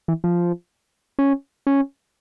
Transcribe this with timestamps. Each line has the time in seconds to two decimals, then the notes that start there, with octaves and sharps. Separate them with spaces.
0.08 E3
0.24 F3
1.19 C#4
1.67 C#4